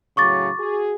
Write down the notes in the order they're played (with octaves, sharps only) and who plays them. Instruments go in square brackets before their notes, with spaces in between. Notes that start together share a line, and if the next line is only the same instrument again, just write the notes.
[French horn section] A2 C#3 F#3 [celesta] C#6 D6 A6
[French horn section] F#4 G#4